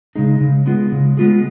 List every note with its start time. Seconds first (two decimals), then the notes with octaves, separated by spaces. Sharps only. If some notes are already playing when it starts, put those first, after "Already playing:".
0.15 C#3 G#3 D#4 G#4
0.41 C#3
0.66 G#3 B3 F4 G#4
0.92 C#3
1.17 G#3 B3 F4 G#4